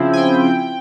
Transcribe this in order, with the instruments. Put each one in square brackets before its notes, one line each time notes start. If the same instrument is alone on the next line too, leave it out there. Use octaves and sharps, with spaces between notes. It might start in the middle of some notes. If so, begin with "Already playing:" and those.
Already playing: [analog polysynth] C#3 F3 C4 E4
G#5
G5